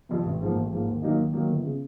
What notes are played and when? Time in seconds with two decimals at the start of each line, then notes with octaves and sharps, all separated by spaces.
0.09 F2 C3
0.25 A1
0.40 G#2 F3 A#3
0.56 A1
0.71 G#2 F3 A#3
0.87 D#2
1.02 D#3 F#3 A#3 D#4
1.18 D#2
1.33 D#3 F#3 A#3 D#4
1.49 G1
1.64 C#3